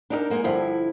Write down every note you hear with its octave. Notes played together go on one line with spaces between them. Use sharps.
D4 D#4 G4 A#4
G#3 A#3 D#4
G2 D3 F3 E4